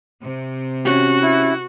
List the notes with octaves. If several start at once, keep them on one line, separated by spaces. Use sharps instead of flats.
C3
C#4 F#4 G4
E4